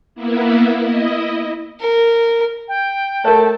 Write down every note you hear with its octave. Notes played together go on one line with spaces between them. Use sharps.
A#3 B3 E4
E4 D#5
A#4
G5
A3 A#4 C#5 A5